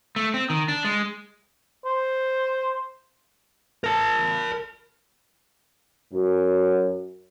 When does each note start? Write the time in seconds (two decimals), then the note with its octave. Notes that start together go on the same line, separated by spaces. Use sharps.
0.16 A3
0.34 C4
0.50 D#3
0.68 D4
0.85 G#3
1.85 C5
3.84 A#4 A5
6.12 F#2